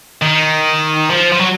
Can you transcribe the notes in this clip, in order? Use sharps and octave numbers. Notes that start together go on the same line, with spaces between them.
D#3
F3
F3
F#3